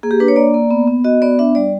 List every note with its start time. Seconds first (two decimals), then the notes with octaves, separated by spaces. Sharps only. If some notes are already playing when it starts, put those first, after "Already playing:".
0.03 A#3 G#4
0.11 G4
0.20 D4 B4
0.28 C#5
0.36 A#3 D5
0.54 A#3
0.71 B3
0.87 B3
1.04 F#4 D#5
1.22 B3 D5
1.39 D4 E5
1.55 G3 D5